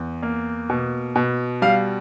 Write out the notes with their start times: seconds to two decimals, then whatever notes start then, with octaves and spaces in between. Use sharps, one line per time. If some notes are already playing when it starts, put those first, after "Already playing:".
Already playing: E2
0.23 A#3
0.69 B2
1.15 B2
1.62 G3 F5